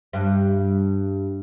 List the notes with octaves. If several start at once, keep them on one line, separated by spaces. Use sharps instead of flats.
G2